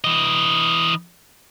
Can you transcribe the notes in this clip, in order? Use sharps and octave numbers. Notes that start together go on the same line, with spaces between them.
E3 D#5